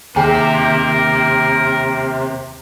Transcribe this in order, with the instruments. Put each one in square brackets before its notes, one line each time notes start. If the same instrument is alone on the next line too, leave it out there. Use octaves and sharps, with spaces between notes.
[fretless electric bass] D#2 [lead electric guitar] C3 [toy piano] G#4 G5 G#5 [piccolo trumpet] A#4